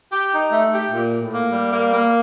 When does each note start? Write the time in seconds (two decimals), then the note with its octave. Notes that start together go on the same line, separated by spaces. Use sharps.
0.12 G4
0.32 D#4
0.52 A3
0.72 G4
0.92 A#2
1.12 A2
1.33 A#3
1.52 G3
1.73 A#3
1.93 A#3